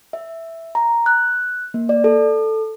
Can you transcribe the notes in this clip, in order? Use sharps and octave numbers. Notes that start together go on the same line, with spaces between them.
E5
A#5
F#6
A#3
D5
A4